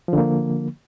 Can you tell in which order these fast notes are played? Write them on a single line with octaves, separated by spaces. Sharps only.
F3 D3 A#3